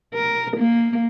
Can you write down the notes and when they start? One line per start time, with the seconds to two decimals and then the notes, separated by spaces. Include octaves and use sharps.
0.14 A#4
0.57 A#3